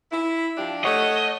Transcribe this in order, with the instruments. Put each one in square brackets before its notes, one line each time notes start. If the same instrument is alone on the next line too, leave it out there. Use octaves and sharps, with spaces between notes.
[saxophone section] E4
F3 D4 G4
[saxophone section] A3 C#5 F#5 [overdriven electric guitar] D#5